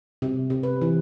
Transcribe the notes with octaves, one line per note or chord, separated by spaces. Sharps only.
C3
C3
B4
E3